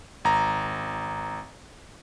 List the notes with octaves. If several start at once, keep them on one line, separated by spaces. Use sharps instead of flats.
G#1 A#5